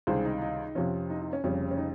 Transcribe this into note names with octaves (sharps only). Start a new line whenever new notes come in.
C#2 C3 D#3 G3 G#4 C5
D#4
D#4
F2 C3 F3 C#4
D#4
D#4
C#4
F1 F2 C#3 G3 C#4
C#4
D#4